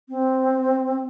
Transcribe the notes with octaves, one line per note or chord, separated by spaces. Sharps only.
C4